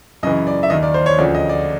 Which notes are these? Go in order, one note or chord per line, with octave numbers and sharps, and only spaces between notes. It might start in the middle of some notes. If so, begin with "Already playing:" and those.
F#2 C#3 E3 D#5
D5
E5
D#2 D#3 D#5
D5
C5
C#5
D2 C#3 F3 D5
D#5
D5